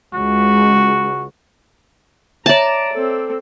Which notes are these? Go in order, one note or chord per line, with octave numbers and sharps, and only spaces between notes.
C#2 F#4
C#5 D5 E5 A5 A#5 A6
C4 A4